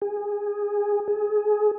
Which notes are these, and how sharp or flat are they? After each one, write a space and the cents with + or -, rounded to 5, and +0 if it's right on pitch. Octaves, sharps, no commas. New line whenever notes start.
G#4 -15
G#4 +20